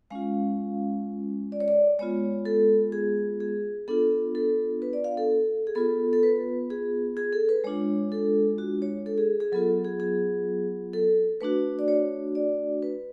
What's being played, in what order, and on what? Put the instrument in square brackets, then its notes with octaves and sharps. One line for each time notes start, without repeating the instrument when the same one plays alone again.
[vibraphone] G#3 C#4 F4 F5
D5
C#5
D5
G#3 B3 F4 C#5
A4
G#4
G#4
B3 D4 F4 A4
A4
B4
D5
F5
A4
G#4
B3 F4 A4
A4
B4
G#4
G#4
A4
B4
G#3 D4 F4 C#5
A4
F#4
C#5
A4
G#4
G#4
F#3 B3 F4 A4
G#4
G#4
A4
A3 D4 F#4 B4
D5
C#5
D5
B4